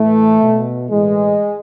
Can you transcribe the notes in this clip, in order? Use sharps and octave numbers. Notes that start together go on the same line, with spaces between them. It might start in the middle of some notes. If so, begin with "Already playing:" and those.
Already playing: A2 E3 A3
B2
A2 E3 G#3